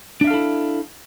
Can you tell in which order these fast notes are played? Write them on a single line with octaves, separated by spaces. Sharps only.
D4 E5 F5 A4 E4